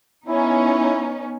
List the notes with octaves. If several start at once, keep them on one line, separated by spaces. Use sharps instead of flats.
B3 C#4 D#4 E4